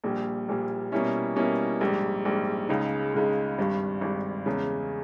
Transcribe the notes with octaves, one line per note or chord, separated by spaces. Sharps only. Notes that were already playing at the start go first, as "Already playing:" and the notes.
A#1 A#2 G3
A#1 A#2 G3
B2 G3 A#3 C#4 E4
B2 G3 A#3 C#4 E4
A#1 G#2 G3
A#1 G#2 G3
C#2 C#3 G#3 D#4
C#2 C#3 G#3 D#4
G#1 G2 G3
G#1 G2 G3
E2 C#3 G#3 C#4